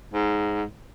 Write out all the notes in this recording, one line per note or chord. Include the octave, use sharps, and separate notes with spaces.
G#2